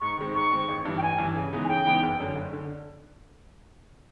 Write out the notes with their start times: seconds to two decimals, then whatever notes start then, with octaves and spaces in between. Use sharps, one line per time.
0.01 G#2 C#6
0.17 D#3 G#3 C4
0.35 G#2 C#6
0.51 D#3 G#3 C4
0.68 A1
0.85 G2 E3
0.98 G5
1.02 A1 G#5
1.18 G2 E3
1.35 C#3
1.53 E3 G#3 B3 D#4
1.64 G#5
1.68 C#3 G5
1.85 E3 G#3 B3 D#4
2.03 F#1
2.20 F#2 D3
2.36 F#1
2.53 D3